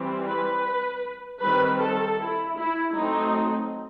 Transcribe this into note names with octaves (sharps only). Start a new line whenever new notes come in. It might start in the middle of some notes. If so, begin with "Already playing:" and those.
Already playing: E3 G3 C4
B4
D#3 G3 C4 B4
A4
E4
E4
F#3 A3 C4 D#4